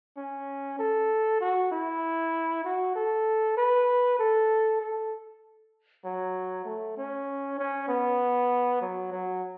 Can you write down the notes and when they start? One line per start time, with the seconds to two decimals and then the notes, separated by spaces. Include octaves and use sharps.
0.17 C#4
0.79 A4
1.41 F#4
1.71 E4
2.64 F#4
2.95 A4
3.57 B4
4.19 A4
4.81 A4
6.04 F#3
6.65 A3
6.97 C#4
7.59 C#4
7.88 B3
8.81 F#3
9.12 F#3